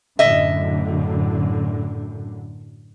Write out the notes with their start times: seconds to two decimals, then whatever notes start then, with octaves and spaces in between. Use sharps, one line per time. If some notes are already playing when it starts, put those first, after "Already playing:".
0.19 F#2 A2 D3 D#5 E5